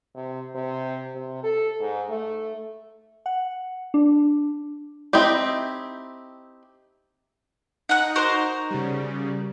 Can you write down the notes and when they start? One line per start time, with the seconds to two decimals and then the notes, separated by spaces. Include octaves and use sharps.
0.16 C3
0.55 C3
1.15 C3
1.43 A4
1.81 G#2
2.09 A3
3.26 F#5
3.94 D4
5.13 C4 D#4 E4 G4
7.89 D#4 F#5 F#6
8.16 F#4 A#4 C5
8.71 C#3 G3